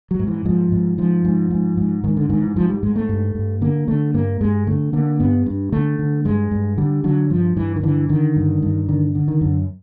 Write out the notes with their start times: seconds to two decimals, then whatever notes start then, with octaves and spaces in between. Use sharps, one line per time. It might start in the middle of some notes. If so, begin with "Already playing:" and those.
0.11 F#3
0.19 G#2
0.28 E3
0.45 G#2 F3
0.72 G#2
0.98 G#2 F3
1.25 G#2
1.51 G#2
1.77 G#2
2.04 G#2 D#3
2.17 D3
2.30 G#2 D#3
2.43 E3
2.56 G#2 F3
2.70 G3
2.83 G#2 G#3
2.96 A3
3.09 G2
3.35 G2
3.61 D3 A#3
3.88 D3 A3
4.14 G2 A#3
4.41 G2 G#3
4.67 D3 A3
4.93 D3 A#3
5.20 G2 B3
5.46 G2
5.72 D3 A3
5.99 D3
6.25 G2 G#3
6.51 G2
6.78 D3 G3
7.04 D3 F#3
7.30 G2 F3
7.56 G2 E3
7.76 D#3
7.83 D3 E3
8.09 D3 D#3
8.36 G2
8.62 G2
8.89 D3 D#3
9.15 D3
9.28 D#3
9.41 F#2 D3